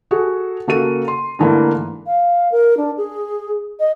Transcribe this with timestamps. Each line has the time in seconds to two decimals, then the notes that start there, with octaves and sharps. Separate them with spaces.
0.11 F#4 G#4 A4
0.67 C#3 A#3 F#4 A4 D#7
1.08 C6
1.39 G#2 D3 E3 A3 A#3 E4
2.06 F5
2.52 A#4
2.77 D4
2.97 G#4
3.80 D#5